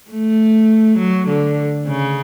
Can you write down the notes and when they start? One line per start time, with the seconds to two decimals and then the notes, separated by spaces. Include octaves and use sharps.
0.11 A3
0.99 F#3
1.28 D3
1.88 C#3